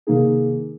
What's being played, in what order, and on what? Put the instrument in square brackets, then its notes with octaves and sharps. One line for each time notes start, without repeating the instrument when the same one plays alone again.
[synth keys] C3 D#3 A#3 D#4 G#4